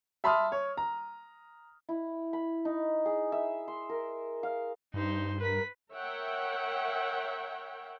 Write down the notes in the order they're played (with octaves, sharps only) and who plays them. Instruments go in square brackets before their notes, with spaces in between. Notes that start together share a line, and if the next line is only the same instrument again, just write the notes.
[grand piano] E5 A5 B5 C6 D#6 F6
C#5
A#5
[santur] E4
B5
D#4
G#4
E5
C6
A#4
F5
[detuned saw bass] G2 [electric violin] D#4 C5
[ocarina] A#4 [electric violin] B4 B6
[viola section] A#4 C#5 E5 F#5 G5